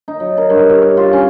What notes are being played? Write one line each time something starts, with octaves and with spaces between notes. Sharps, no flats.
D#4
F#3
A#4
G2
C#5
G4
F4
C#4